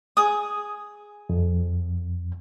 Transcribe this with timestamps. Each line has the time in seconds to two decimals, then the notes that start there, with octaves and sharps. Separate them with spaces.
0.17 G#4 D#6
1.29 F2